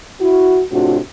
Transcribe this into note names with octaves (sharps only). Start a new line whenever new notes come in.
E4 F#4
A2 C3 D4 F4 F#4